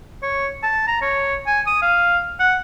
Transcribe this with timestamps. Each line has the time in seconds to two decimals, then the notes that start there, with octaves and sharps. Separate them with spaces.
0.23 C#5
0.63 A5
0.88 A#5
1.01 C#5
1.47 G#5
1.66 D#6
1.82 F5
2.40 F#5